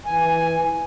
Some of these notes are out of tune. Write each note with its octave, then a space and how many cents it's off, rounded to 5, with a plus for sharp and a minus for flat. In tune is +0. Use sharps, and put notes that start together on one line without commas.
E3 -5 G#5 +0